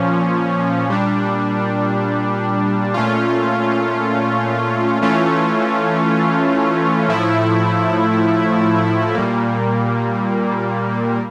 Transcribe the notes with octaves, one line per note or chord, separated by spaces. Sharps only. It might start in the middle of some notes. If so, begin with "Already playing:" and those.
Already playing: A#2 F3 C#4
A#2 G3 D4
A#2 A3 C#4 F4
E3 A3 C#4 F4
A2 F3 A3 E4
A#2 G3 A#3